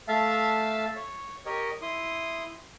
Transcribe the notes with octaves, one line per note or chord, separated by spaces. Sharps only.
A3 E5 F5 A5
C#5
G4 A#4 C#5 D#5
E4 C6 D#6